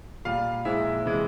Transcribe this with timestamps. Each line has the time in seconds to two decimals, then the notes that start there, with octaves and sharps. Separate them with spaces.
0.25 A#2 G3 F4 F5
0.65 A#2 F3 G#3 E4 E5
1.06 C3 E3 G#3